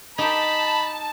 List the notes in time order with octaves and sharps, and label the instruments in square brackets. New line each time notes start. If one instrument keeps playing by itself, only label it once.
[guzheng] D#4 G4 [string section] A5 [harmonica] B5